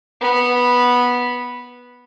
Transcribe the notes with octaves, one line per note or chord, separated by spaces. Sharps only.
B3 B5